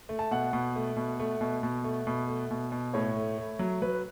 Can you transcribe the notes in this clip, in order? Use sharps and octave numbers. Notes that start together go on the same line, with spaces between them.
A3
A5
B2 F#5
B2
A3
B2
A3
B2
B2
A3
B2
A3
B2
B2
A2 C#5
A3
A3
F#3
F#3 B4